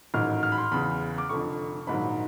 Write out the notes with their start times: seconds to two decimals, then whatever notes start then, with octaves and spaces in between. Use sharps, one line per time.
0.14 A1 G#2 D#3 F#3 F6
0.43 F6
0.52 B5
0.58 C6
0.72 E2 C#3 E3 B5
1.18 D6
1.29 F1 F2 D3 C#6
1.87 A#1 G#2 D#3 F#3 B5